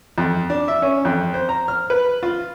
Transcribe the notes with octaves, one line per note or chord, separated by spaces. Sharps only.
F2
D4
E5
C#4
F2
C5
A#5
F6
B4
F4